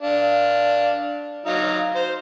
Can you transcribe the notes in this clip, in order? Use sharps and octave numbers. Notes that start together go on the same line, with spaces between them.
D4 F5
F#3 D#4 F5
C5